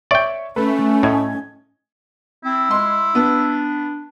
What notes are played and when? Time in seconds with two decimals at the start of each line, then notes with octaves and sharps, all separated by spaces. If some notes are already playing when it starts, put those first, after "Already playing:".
0.11 C#5 D5 E5 G5 C#6
0.56 A3 C#4 B4
1.03 A2 D#5 G#6
2.44 C4 E4
2.71 G#3 C6
3.15 B3 D4